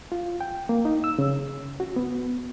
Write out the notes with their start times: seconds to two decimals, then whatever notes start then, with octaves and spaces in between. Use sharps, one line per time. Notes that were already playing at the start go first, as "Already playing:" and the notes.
0.12 F4
0.41 G5
0.69 A#3
0.85 D#4
1.04 E6
1.19 C#3
1.80 F#4
1.96 B3